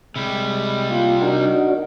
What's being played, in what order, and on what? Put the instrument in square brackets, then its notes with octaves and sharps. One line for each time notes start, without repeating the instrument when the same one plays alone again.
[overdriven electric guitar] C3 G3 [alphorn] G#3 [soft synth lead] B5
[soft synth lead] A#3 [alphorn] F4
[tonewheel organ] D4 F#4 [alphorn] D#4 [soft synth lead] A#4